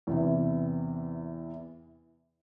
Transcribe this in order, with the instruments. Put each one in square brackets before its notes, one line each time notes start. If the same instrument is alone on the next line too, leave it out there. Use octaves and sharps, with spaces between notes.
[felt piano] E2 C3 E3